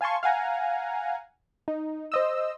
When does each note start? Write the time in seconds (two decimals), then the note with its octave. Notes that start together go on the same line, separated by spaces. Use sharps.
0.01 F5 G#5 A5 C6 C#6
0.23 F5 F#5 G#5 A#5
1.68 D#4
2.12 C5 D#5 E6